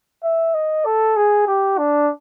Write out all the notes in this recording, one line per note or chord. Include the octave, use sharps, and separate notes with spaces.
E5
D#5
A4
G#4
G4
D4